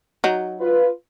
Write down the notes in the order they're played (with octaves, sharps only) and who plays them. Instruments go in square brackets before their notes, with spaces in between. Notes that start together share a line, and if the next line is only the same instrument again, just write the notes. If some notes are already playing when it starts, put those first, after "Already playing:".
[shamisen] F#3 D#4
[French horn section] F4 B4